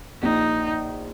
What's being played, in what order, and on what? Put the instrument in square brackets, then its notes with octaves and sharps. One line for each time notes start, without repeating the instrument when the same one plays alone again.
[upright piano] A#1 [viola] D#4